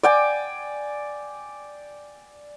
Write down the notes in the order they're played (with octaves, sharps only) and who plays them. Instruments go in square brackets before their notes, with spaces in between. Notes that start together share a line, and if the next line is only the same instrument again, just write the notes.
[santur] D5 G5 G#5